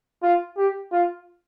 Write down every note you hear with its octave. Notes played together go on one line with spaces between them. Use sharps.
F4
G4
F4